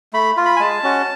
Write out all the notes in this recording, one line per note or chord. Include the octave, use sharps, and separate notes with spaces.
A3 B5
F4
B5
G#5
G#3 A5
C#4 F#4